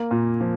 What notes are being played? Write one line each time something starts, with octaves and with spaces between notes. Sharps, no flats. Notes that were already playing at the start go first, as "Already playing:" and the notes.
Already playing: A#3
A#2
F3